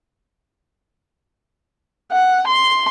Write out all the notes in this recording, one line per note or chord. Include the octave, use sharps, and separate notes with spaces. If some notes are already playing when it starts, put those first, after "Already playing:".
F#5
C6